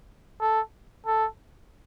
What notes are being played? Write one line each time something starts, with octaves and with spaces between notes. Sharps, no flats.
A4
A4